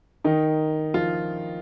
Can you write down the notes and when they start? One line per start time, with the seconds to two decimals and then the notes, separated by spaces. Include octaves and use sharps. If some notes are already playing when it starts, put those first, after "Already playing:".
0.24 D#3 D#4
0.94 F3 F4